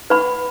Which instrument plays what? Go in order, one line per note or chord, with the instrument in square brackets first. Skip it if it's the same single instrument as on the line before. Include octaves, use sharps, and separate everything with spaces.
[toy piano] B4 F#5 B5